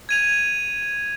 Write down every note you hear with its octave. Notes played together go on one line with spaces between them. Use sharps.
G#6 D#7 F7